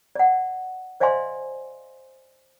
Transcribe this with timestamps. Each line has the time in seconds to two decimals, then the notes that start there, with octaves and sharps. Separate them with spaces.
0.15 D5 F#5
1.00 C5 D5 D#5 F5 G#5 C6